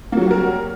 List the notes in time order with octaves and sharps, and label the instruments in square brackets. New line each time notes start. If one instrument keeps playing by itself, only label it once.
[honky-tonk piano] A#3
F#3
F#4
G3
A#4